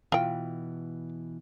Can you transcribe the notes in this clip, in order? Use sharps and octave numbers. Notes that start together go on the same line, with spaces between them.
B2 E3 F4 G5